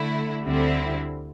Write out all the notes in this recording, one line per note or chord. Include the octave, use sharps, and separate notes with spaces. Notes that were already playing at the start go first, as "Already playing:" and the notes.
Already playing: D3 A3 E4
D2 D3 G3 C4 E4